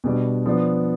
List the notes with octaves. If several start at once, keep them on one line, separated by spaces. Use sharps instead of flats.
B2 G3 D4
F3 B3 D4